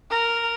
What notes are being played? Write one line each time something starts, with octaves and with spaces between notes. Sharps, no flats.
A#4